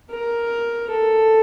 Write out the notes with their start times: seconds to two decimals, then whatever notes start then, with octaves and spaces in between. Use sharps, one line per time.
0.10 A#4
0.91 A4